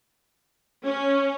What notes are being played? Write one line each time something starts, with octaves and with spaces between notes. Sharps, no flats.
C#4